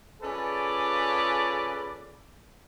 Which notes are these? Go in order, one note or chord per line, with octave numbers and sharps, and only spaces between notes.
C#4 F4 G#4 A4 B4 D5